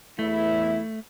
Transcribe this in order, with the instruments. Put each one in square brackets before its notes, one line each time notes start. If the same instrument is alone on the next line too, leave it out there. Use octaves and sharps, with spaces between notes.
[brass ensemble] E2 E4 [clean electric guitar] A3